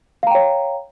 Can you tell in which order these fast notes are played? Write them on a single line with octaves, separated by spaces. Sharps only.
F5 A#5 G5 C#5